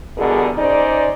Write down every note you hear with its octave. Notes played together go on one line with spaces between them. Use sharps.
E2 B2 D3 G3 G#4 A#4
C#4 D#4 C5 D5